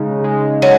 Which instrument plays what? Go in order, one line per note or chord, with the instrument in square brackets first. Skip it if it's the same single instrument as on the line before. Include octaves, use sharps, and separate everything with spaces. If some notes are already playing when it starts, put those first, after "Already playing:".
Already playing: [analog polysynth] C#3 G#3 D#4
G#3
[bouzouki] F#3